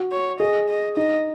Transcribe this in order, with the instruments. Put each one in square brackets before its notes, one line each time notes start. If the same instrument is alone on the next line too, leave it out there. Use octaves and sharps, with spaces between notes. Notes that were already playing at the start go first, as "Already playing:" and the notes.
Already playing: [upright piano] F#4
[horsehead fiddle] C#5
[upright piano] G#4 [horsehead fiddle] D#5
[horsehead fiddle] D#5
[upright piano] D#4 [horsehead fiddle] D#5